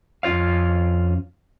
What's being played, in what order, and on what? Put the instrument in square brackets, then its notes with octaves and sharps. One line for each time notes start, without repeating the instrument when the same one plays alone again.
[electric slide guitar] F2 C#4 F4 C#5 F5